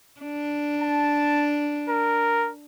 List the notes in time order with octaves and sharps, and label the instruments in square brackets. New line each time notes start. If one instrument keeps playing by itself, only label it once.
[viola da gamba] D4
[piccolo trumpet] A5
A#4